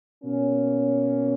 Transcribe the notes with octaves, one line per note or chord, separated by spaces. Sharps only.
B2 A#3 C#4